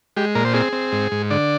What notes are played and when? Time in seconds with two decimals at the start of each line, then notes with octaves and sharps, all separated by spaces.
0.17 G#3 G4
0.35 A#2 A#4
0.45 C5
0.54 C4 G#4
0.73 C4
0.92 G#2
1.12 G#2
1.31 D3 D5